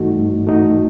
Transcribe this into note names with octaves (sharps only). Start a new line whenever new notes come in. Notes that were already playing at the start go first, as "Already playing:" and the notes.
Already playing: G2 E3 A3 D#4 F#4
G2
E3 A3 D#4 F#4